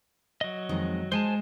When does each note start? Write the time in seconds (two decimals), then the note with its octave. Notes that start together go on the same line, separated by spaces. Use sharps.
0.41 F#3 D#5
0.69 F2 D#3 G#3
1.12 G#3 C5 G#5 A5